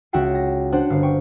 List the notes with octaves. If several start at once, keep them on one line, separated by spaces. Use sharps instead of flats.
C#2 F#4 E5 F#5 G5 C7
A#6
D4 C5 F#5
G1 F5 C7
G5 C#6 C#7